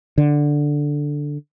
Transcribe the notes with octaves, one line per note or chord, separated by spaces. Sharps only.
D3